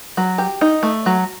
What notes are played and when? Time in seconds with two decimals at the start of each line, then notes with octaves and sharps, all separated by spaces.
0.17 F#3
0.38 G4
0.61 D#4
0.83 A3
1.06 F#3